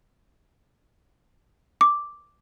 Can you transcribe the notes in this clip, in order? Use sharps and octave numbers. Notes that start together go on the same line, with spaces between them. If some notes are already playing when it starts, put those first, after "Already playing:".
D6